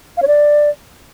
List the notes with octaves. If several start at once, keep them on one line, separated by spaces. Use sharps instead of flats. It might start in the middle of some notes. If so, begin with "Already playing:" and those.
F5
C#5
D5